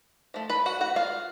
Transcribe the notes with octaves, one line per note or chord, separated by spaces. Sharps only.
F3 A3
B4 B5
F#4 F#5
F#4 F#5
F4 F5